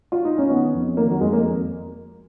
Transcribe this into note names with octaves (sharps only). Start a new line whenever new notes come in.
F4
D#4
C#4
D#3 B3
F2
D#3 A#3
F#3
F2 G#3
A#3